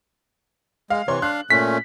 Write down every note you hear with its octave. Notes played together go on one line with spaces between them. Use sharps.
G#3 F5
C3 E3 C#5 C6
D4 F5 F#6
A#2 A3 C#4 B6